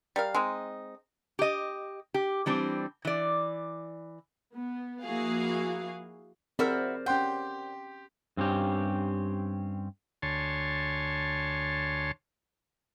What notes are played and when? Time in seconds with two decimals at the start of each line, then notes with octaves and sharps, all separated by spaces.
0.16 G3 A#4 F5
0.35 G#3 C4 D#4
1.39 G4 D#5
2.14 G4
2.46 E3 G3 C4 D4
3.05 E3 D5
4.54 B3
5.03 F3 A#3 E4 F#4 G#4 F5
6.59 C4 F#4 G#4 A#4 C5 D5 E5 B5
7.06 C#4 G4 F#5 G5 C6 G6
8.37 G2 C4 C#4 G4
10.22 D2 C#5 G#5 A5 C6